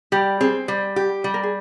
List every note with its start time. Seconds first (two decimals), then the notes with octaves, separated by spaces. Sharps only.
0.12 G3 G4
0.41 C4 G#4
0.68 G3
0.96 G4
1.24 G3
1.34 A#4
1.43 G#4